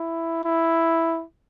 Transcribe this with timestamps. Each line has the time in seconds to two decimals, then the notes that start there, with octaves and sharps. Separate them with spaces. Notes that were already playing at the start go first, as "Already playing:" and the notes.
Already playing: E4
0.44 E4